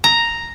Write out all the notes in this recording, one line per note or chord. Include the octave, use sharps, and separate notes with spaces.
A#5